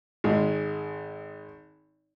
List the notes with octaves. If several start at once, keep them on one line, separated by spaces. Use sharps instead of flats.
G#1 G#3